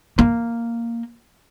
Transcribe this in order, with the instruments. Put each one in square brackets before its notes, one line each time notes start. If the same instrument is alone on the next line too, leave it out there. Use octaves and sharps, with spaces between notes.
[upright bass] A#3